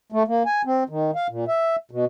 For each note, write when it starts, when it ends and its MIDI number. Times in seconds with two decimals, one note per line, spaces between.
0.12 0.23 57
0.28 0.43 58
0.46 0.62 80
0.65 0.84 60
0.89 1.11 51
1.15 1.27 77
1.29 1.45 46
1.48 1.76 76
1.91 2.05 47